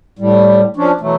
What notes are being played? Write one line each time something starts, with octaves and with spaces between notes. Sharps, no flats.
A2 G3
F3 C#4 D4
B2 E3 F#3 A3